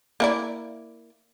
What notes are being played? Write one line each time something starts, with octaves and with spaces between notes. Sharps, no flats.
A#3 E4 D5